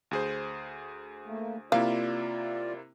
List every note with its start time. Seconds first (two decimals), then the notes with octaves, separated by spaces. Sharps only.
0.11 D2 G#4 C5
1.26 A3 A#3
1.72 C3 A#3 E4 F4 D5 F5